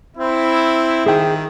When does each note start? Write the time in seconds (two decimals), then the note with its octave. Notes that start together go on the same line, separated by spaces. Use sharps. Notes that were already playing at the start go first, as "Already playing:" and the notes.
0.17 C4 E4
1.06 D#3 G#4 G5